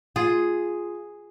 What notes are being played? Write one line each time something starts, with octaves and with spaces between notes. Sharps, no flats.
F4 G#4